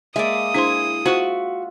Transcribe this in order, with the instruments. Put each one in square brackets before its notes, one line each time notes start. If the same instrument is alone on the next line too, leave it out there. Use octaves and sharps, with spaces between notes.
[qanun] G#3 A#3 D5 [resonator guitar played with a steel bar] E5 [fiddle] D#6
[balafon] D4 C5 C6 [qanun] E4 G#4 C#6
[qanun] F4 E5 F#5 [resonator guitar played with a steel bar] F#4 [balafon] C5 C#6